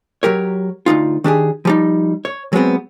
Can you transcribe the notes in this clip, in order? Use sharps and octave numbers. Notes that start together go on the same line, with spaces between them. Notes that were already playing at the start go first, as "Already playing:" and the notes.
F#3 G4 A#4 C#5
D2 C3 D#4 F4
D#3 D4 G4 G#4
F3 G3 D#4
C#5
F#3 G#3 B3 C4